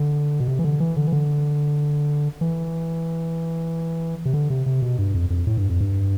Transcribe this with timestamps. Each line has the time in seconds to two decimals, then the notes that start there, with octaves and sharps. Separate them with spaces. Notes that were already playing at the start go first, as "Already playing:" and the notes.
Already playing: D3
0.40 B2
0.48 C3
0.59 E3
0.64 D3
0.80 E3
0.96 D3
1.07 E3
1.12 D3
2.41 E3
4.25 C3
4.34 D3
4.50 C3
4.66 C3
4.82 B2
4.98 G2
5.14 F2
5.30 F2
5.47 A2
5.57 G2
5.70 F2
5.81 G2